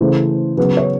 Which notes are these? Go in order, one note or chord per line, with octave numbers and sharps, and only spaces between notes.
C#3 E3 A3 C5
C#3 F#3 B3 B4
C#5